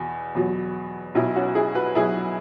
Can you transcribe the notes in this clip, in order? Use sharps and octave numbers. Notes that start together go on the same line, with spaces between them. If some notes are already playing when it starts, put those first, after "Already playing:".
Already playing: E2 B2
E2 B2 F#3
B1 B2 F#3 E4
C#4 F#4
E4 G#4
F#4 B4
B1 B2 F#3 E4 G#4